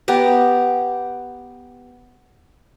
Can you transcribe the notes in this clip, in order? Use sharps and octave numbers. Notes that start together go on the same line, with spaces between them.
B3 G4 A#5